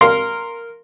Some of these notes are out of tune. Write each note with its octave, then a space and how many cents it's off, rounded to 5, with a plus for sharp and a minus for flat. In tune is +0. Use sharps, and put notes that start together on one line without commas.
A#4 -5 F5 +0 C6 +0